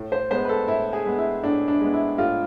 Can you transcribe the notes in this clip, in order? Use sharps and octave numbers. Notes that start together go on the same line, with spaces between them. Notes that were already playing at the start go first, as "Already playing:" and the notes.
Already playing: A2
C5
G#3 B3 C5
B4
A4
A2 E4
G#4
G#3 B3
E4
A2 D4
D4
G#3 B3
E4
A2 F4